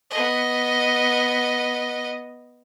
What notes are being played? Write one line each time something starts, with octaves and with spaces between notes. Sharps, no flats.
B3 D#5